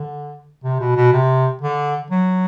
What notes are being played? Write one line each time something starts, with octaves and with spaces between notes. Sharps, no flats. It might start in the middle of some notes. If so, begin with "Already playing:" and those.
Already playing: D3
C3
B2
B2
C3
D3
F#3